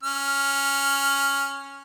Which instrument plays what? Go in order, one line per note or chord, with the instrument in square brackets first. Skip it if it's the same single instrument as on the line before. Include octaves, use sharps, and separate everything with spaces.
[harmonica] C#4 F6